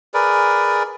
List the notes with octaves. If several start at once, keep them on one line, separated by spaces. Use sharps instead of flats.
G#4 A#4 B4 D5